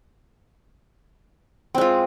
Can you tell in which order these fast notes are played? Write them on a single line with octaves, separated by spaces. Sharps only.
C4 G#3 F4